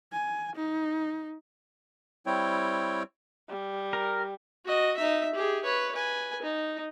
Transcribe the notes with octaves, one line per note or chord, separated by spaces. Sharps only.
G#5
D#4
G3 C4 E4 C#5 G5
G3
A#4
F#4 D#5
D#4 E5
G4 G#4
B4 C#5
B4 G#5
D#4